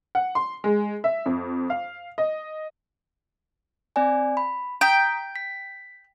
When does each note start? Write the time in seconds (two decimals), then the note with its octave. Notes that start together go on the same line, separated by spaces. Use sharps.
0.15 F#5
0.35 C6
0.64 G#3
1.04 E5
1.26 F2
1.70 F5
2.18 D#5
3.96 C4 D5 G#5
4.37 B5
4.81 G5 A#5 D#6 B6
5.36 B6